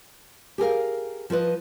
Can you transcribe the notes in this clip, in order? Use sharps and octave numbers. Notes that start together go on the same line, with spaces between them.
G4 G#4 A#4 F5
F3 F4 B4 D#5